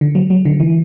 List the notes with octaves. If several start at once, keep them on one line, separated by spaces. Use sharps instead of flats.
D3
F#3
F#3
D3
E3